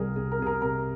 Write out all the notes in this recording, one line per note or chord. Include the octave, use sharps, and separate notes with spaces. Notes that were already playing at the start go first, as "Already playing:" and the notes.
Already playing: C2 C3 G#4 A#4
C3 G#4
A#4
C3 G#4
A#4
C3 A#4